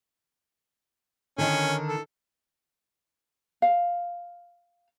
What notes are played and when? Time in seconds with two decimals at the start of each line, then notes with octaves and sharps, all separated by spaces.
1.38 D3 D#3 C#4
1.88 A4
3.62 F5